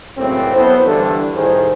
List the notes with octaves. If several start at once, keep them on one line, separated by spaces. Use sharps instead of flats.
C#2 F#2 A2 C4
F#2 B3 E4 A4 C5
G2 D3 E3 A4
C2 A2 D#3 G#4 C5